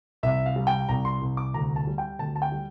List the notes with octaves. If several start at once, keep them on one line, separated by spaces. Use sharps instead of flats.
C2 E5
F5
G3
G5
C2 A#5
C6
C2
D6
D2 A#5
A5
G3
G5
D2 A5
A5
G5
G3